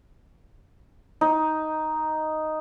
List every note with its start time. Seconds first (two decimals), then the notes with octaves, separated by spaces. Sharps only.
1.21 D#4